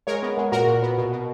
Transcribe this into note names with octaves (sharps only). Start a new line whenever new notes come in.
G#3 A#4 C#5
B3
G#3
A#2 F#4 A#4
A#2
B3
B2
B2